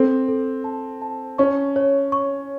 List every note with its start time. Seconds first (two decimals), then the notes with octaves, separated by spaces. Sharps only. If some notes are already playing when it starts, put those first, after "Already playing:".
Already playing: C4 A4
0.28 A4
0.64 A5
1.02 A5
1.38 C#4 C#6
1.76 C#5
2.12 C#6